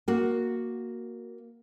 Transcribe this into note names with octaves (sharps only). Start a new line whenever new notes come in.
A#3 F#4